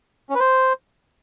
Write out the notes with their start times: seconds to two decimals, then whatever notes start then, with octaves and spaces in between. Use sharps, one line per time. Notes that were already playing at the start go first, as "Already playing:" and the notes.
0.30 C#4
0.35 B4
0.40 C5